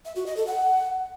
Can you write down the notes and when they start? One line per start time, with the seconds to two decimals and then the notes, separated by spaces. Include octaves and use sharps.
0.05 E5
0.16 F#4
0.26 D#5
0.37 A4
0.47 F#5